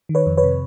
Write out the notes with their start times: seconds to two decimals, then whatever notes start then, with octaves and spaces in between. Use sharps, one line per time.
0.09 D#3
0.15 B4 C#5
0.26 F2
0.37 B4 C#5
0.44 C3